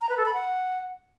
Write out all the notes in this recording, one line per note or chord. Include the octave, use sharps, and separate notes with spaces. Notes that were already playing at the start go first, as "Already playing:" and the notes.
A#5
B4
A4
B5
F#5